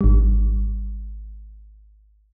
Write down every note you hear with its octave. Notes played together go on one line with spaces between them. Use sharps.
G#1 G3